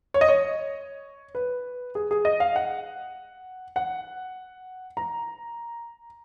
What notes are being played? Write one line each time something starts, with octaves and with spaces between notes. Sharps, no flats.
C#5
D#5
C#5
B4
G#4
G#4
D#5
F5
F#5
F#5
A#5